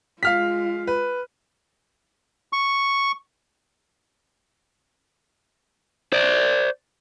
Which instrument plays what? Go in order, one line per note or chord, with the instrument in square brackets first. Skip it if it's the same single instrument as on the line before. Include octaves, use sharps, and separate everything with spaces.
[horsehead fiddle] G#3 F4 [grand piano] F5 F6 B6
[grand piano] B4
[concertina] C#6
[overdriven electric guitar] C5 D5